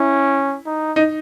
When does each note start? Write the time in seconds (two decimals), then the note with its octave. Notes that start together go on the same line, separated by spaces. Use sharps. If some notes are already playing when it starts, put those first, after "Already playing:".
Already playing: C#4 E4
0.66 D#4
0.96 D#4